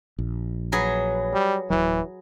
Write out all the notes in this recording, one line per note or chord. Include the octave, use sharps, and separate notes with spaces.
A#1
F#3 G#4 B4
G3
D1 B1 E3 F#3